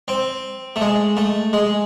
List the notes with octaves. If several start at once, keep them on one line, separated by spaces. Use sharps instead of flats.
C4
A3
G#3
A3
G#3